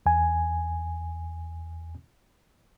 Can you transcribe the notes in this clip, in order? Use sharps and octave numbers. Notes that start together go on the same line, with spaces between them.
E2 G#5